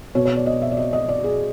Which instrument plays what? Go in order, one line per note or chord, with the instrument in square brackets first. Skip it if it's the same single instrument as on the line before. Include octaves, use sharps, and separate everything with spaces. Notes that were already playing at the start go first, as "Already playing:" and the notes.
[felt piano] B2 C#5
C#5
D5
D#5
E5
D5
D#5
D#5
D5
G#4